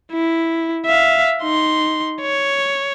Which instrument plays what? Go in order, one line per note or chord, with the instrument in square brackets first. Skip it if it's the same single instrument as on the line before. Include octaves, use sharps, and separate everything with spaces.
[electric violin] E4
E5 F5
D#4 C6
C#5